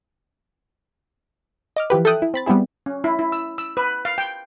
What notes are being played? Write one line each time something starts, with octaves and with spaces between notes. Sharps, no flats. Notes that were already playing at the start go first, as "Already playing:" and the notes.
D#5 D6 F6
E3 F3 G4 B4
A4 E5 G5 D#6 F#6
E4
C4 B5 A6
G3 B3 C4 E4 G#4
C#4
E4
E4
E6
E6
B4
F5
G5